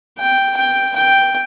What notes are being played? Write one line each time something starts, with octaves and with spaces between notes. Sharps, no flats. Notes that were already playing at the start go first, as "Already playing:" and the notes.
G5
G5
G5